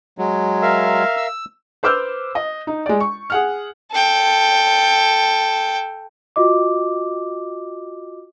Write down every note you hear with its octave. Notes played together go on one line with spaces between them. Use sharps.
F#3 G#3
A#4 E5 F5
E6
B4 C5 D6 E6 F6 G6
D#5
D#4
G#3 D5
C#6
G#4 F#5 F6
A4 G5
F4 F#4 D#5 D6